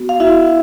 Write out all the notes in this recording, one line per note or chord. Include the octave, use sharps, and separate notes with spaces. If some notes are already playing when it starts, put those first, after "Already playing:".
Already playing: B3 F#4
F5
E4 F#4 E5